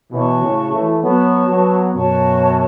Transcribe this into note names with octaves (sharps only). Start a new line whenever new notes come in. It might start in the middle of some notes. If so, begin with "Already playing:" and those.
B2 E3 F#4 C#5 A5 C#6
A2 C#3
E3 A3
F#3 B3 F#4 C#5 A5 C#6
F#3 B3
F#2 B2 F#4 C#5 A5 C#6